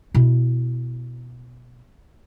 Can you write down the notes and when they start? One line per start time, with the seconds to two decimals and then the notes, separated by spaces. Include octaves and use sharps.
0.14 B2 E4